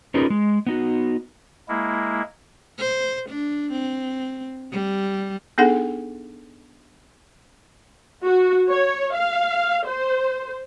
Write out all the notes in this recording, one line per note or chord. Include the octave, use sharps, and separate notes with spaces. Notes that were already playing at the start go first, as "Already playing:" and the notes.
C#4 D#4 F4 G#4 A#4 B4
G#3
B3 D#4 F#4
G#3 A#3 E4
C5
D4
C4
G3
B3 D4 D#4 G#4 A4 F#5
F#4
C#5
F5
C5